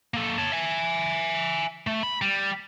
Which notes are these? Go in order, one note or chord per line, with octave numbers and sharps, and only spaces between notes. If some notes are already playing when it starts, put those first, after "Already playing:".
A#3 A4
C#5 A5
E5 G#5
A3
B5
G3